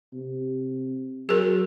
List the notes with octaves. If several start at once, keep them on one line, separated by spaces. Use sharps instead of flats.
C3
F#3 G#4 A#4